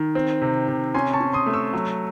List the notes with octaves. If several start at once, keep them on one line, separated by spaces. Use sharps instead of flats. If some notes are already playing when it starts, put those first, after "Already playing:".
Already playing: D#3
C4
C3
C3
C#4 G#5 C6
A5 C#6
C#4
C6 D#6
A3
C#6 E6
F#3